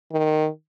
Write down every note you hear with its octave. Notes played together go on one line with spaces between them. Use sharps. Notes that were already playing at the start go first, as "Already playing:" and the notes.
D#3